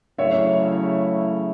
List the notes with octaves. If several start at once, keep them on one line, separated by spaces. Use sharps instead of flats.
C#3 F#3 A3 E4 C#5 E5